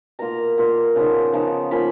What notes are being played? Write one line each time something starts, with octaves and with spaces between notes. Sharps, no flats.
B2 A#3 F4 A#5
B2 A#3 F4
C#3 F3 B3 D#4
C#3 F3 B3 D#4
F3 A#3 C#4 F4 B5